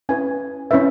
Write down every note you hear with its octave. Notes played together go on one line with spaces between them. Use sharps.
C#4 E4 B4 G#5
C#4 E4 B4 E5